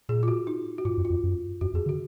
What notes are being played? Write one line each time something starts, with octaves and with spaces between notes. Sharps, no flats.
A#2 G#4
F4
F#4
D#4
F#4
G#2 F4
F#2
F4
F2
F#2
F#2 F#4
F2 G#4
D3
F#4